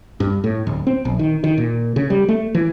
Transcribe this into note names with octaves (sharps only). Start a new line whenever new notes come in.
G2
A2
D1
C4
A#1
D#3
D#3
A#2
C#3
G3
A3
E3